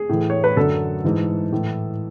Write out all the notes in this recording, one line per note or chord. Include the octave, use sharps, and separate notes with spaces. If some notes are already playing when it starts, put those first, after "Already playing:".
Already playing: G#4
A2 E3
C#5
B4
F#2 D3 F#3 A4
G#2 E3
A2 E3